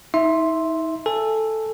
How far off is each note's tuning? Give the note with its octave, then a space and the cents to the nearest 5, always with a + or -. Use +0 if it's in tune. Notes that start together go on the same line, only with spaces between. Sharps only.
D#4 +40 E5 +0 C6 +0
A4 +0 G#5 -10